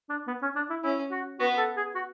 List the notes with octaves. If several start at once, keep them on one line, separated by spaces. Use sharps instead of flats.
D4
B3
C#4
D4
E4
C#4 E4
F#4
B3 F#4
A4
G#4
F#4